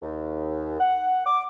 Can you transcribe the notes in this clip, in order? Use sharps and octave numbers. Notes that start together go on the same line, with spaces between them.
D#2
F#5
D6